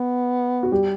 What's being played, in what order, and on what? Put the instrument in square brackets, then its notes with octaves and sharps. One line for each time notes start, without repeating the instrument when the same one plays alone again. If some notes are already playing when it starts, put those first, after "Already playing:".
Already playing: [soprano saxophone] B3
[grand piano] F#4
G3 G4